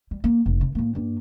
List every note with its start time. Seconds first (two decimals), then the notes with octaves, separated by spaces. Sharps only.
0.11 G3
0.24 A#3
0.46 F1
0.61 C3
0.75 A2 A#3
0.95 G2 A#3